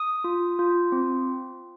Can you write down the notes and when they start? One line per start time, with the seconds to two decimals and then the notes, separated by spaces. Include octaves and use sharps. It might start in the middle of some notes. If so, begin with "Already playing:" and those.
Already playing: D#6
0.24 F4
0.59 F4
0.92 C4